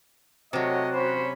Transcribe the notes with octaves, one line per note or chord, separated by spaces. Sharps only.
C3 F#3 A3 F#4 C#5 D#5
C#4 C5 B5 C#6